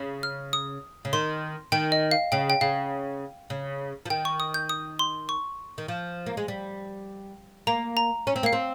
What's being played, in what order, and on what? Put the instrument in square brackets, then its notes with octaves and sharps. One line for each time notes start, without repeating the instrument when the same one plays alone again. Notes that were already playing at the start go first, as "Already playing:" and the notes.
Already playing: [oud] C#3
[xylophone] F6
D#6
[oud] C#3
[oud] D#3 [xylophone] C6
[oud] D#3 [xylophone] G5
[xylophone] D#5
F5
[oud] C#3 [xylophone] G5
[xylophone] G5
[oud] C#3 [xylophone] F5
[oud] C#3
F3
[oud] D#3 [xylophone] G5
[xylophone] C#6
D#6
G6
D#6
C6
C#6
[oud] D#3
F3
A#3
G#3
G3
[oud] A#3 [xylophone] A#5
[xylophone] A#5
[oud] C#4
C4
[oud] A#3 [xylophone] F5
[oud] C4